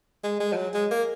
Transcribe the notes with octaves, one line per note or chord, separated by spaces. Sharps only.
G#3
G#3
F3
F#3
G#3
A#3